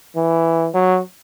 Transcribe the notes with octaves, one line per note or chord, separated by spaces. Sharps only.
E3
F#3